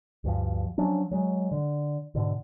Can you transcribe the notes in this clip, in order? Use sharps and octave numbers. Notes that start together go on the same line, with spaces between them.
D2 G2 F3
F3 F#3 C#4 D4
F#3 G#3
D3
G#2 B2 D3